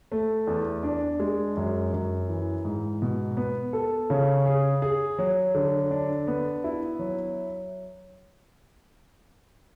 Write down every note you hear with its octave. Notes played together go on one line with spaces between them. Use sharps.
A3
E2
D4
G#3
F#2
F#2
E3
G#2
B2
B3
A4
C#3
G#4
G#4
F#3
D3
D4
B3
E4
F#3